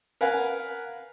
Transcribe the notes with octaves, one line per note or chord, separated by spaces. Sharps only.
A#4 B4 F5 F#5 G#5